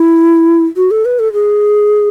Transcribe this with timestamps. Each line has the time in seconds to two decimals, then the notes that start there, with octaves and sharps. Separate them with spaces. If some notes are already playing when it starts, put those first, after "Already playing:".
Already playing: E4
0.77 F#4
0.91 A4
1.05 B4
1.19 A4
1.33 G#4